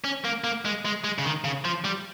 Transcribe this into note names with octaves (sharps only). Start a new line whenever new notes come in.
C#4
A#3
A#3
G#3
G#3
G#3
C#3
D#3
C#3
F3
G3